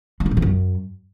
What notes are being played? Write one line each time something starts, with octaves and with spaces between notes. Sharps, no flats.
G#3
E3
A2
E3
F#2